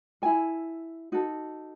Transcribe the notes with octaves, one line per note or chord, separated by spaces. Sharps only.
E4 A4 G#5
D#4 F#4 A4